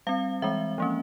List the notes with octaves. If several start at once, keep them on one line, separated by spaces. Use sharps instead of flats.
G3 C4 F5
E3 G#3 C4 E5
F3 A#3 C#4